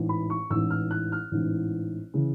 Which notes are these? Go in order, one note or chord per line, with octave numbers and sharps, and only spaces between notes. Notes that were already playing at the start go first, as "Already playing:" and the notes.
Already playing: A1 G#2 E3
B5
C#6
A1 G#2 E3 E6
F6
F#6
F6
A1 G#2 E3
C#3 E3